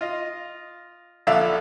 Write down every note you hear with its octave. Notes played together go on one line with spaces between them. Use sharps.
F4 D#5
A#1 D3 D5 E5 F5 E6